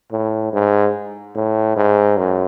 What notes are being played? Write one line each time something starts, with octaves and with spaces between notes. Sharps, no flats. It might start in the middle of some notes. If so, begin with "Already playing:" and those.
A2
G#2
A2
G#2
F#2